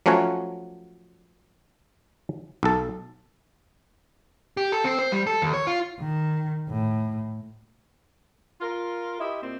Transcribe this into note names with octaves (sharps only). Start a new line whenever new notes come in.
F3 F#3 A3 C#4 F#4 C#5
B1 A4
G4
A4
C4
C5
G3
A4
D#2
C#5
F4
D#3
A2
F4 A#4
E4 G4 D#5 E5
A#2 C4